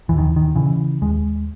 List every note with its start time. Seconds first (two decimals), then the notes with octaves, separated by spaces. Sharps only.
0.09 D#2 E3
0.18 D#3
0.36 D#3
0.56 C#3 E3
1.01 D#2 G#3